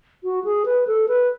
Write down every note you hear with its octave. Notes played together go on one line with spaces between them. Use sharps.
F#4
G#4
B4
A4
B4